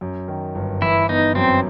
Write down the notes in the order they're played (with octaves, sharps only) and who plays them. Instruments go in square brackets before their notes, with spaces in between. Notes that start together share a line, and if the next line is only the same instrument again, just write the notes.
[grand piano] F#2
D#3
G1
[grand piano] E3 [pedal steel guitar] E4
[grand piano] B3 [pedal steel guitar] D#4
[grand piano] F#2 [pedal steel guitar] C4